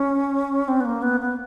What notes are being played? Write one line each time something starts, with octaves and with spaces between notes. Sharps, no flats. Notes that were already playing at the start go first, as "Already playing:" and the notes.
Already playing: C#4
C4
B3
A#3
B3
B3